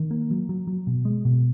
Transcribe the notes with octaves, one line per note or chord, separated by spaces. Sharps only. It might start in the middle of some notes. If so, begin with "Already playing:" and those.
Already playing: D#3
A#3
F#3
F#3
F#3
B2
G#3
B2